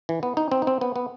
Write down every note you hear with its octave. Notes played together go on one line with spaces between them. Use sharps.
E3
B3
D#4
C4
D#4
C4
B3
B3